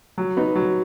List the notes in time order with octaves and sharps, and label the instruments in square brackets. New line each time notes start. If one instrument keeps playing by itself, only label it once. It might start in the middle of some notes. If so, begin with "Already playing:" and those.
[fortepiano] F#3
B3 D#4
F#3